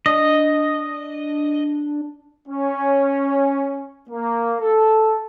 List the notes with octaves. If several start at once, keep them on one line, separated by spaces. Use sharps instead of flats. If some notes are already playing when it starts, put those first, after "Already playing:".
D4 D#5
C#4
A#3
A4